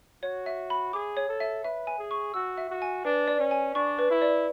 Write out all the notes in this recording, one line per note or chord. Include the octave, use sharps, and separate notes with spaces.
F#4 C#5
E5
B5
G#4 D6
C#5
A4
E5
B4 E5
G#5
G#4
C#6
F#4 E6
E5
F#4
G#5
D4 B4
D5
C#4
G#5
D4 C#6
B4
E4
D5